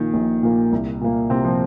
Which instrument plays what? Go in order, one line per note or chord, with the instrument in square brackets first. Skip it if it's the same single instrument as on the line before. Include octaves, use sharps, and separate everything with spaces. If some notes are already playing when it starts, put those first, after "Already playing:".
Already playing: [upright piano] A#1 A#2 A#3 [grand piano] D#3
[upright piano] A#1
A#2 A#3
C2
A#2 A#3
[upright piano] C2 [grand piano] C3 C4
[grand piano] F3